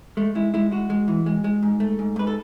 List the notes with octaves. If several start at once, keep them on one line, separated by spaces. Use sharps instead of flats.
G#3 A3
G#3 E4
G#3 E4
G#3 F#4
G#3
E3
G#3
G#3
G#2
A3
G#2
G#2 B4
A4